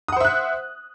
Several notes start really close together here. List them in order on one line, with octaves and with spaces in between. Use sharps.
D#6 F#5 C5 E5 F#6